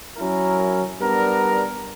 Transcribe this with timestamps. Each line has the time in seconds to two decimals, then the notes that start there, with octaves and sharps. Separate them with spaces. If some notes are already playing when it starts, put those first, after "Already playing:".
0.17 F#3 C#4 E4 A#4
0.99 G3 B3 D4 A#4